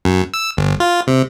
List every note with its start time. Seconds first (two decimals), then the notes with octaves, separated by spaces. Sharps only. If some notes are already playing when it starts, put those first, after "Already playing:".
0.05 F#2
0.34 E6
0.57 G1
0.80 F4
1.07 C3